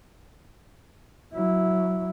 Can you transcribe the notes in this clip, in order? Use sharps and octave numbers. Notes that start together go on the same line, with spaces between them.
F#3 E4